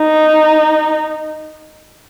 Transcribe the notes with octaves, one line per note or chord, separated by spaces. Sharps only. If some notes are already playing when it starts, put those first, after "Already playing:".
Already playing: D#4